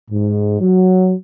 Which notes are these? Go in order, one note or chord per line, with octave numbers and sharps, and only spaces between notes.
G#2
F#3